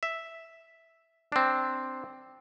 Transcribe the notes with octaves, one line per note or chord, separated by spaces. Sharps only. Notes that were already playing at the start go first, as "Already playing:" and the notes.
E5
C4 D4